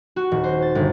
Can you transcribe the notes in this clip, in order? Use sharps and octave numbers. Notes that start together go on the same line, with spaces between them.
F#4
D#1
C5
A6
G1